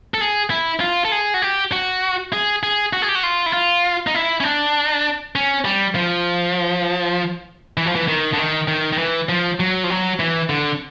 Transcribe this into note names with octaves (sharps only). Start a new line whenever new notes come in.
A4
G#4
E4
F4
A4
G#4
F#4
G4
F#4
G#4
G#4
F#4
G#4
G4
F#4
F4
E4
F4
D#4
E4
C#4
D4
C#4
G3
F3
E3
F3
E3
D#3
D3
D#3
D#3
D#3
E3
F3
F#3
F3
F#3
E3
D3